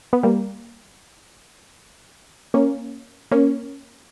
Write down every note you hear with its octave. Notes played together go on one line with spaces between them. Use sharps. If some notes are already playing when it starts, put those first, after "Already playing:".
B3
G3 A#3
A#3 C#4
A#3 C#4